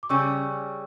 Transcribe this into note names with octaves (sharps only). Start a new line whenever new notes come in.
D6
C#3 G3 C#4 C#6 E6